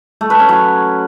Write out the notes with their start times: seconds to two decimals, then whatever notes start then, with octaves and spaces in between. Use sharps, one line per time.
0.21 A3
0.30 B4
0.39 C#4
0.49 F#3